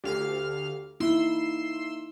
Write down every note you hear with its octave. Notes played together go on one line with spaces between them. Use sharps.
D2 G4 A4 F5 F6
A#3 D#4 E4 E5 C6 E6